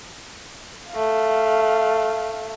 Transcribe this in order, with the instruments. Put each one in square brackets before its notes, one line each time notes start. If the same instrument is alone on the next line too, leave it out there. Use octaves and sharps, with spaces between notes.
[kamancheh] A3 F5